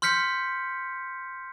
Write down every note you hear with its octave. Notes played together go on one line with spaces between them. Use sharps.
C6 F6 G6 B6 C#7